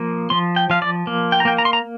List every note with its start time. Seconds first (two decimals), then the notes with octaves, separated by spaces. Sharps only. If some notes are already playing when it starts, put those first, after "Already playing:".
Already playing: F3 A#3
0.30 F3 C6
0.56 G5
0.70 F3 F5
0.82 D5
1.07 A#3
1.32 G5
1.40 A#5
1.45 A#3 G5
1.58 A#5
1.65 C6
1.73 A#5